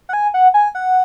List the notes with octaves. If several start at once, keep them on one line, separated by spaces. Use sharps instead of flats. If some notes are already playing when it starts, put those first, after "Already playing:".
F#5
G#5
F#5
G#5
F#5